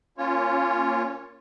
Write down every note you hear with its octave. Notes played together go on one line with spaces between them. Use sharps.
A#3 C#4 F4 C#5